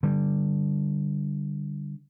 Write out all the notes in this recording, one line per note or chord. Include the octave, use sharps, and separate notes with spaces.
D3 G3